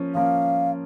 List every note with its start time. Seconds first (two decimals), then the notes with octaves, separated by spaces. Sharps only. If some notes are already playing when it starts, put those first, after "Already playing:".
Already playing: F3 A#3 C#4
0.15 F3 A#3 C#4 F5